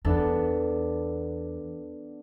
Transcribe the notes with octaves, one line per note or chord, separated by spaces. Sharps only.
E2 B3 D4 A4